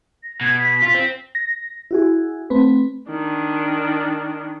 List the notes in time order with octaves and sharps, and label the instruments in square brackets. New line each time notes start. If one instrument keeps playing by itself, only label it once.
[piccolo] A#6
[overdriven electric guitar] B2 [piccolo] G#6
[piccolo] B6
[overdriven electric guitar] F4 [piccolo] B6
[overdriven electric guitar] C4
[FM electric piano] A#6
E4 F#4 G#4
A3 C4 B4
[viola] D#3 D4